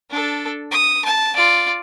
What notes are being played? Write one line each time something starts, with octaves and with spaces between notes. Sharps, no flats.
D4 A4
D#6
A5
F4 D5